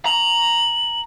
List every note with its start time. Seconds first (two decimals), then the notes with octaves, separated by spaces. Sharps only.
0.05 A#5 F#7